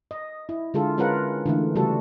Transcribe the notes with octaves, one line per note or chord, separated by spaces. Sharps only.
D#5
E4
D3 G#3 F4 A4
G#3 C#4 F4 A#4 B4 F#5
D3 E3 A3
C#3 G3 A3 F#4 A4